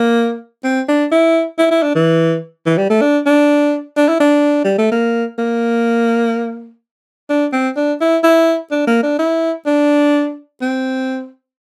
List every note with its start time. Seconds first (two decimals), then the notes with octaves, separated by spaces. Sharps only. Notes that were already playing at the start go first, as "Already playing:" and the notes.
Already playing: A#3
0.64 C4
0.88 D4
1.12 E4
1.59 E4
1.71 E4
1.82 D4
1.95 E3
2.66 E3
2.78 G3
2.90 A3
3.01 D4
3.26 D4
3.97 D4
4.09 E4
4.20 D4
4.64 G3
4.78 A3
4.92 A#3
5.38 A#3
7.29 D4
7.53 C4
7.76 D4
8.01 E4
8.24 E4
8.71 D4
8.87 A#3
9.03 D4
9.19 E4
9.66 D4
10.62 C4